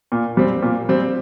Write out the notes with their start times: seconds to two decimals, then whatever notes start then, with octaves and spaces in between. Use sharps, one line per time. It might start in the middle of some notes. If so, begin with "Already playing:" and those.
0.12 A#2
0.37 G3 C4
0.62 A#2
0.89 G3 C4